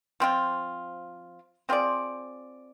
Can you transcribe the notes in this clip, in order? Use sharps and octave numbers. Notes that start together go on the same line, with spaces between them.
F3 C4 F4
C4 F4 G#4 D5